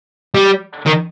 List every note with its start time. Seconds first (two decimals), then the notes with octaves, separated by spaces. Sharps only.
0.34 G3
0.86 D#3